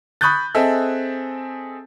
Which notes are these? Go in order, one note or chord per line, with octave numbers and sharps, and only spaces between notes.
B5 C#6 D#6 F#6 G6 A6
C4 G#4 A4 D#5 E5